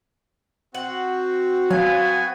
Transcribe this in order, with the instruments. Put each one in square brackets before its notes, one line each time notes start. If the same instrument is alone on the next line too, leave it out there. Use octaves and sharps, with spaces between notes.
[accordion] C4 F#4 [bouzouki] F#5
[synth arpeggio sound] F#3 [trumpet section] B3 G#5 [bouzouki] F5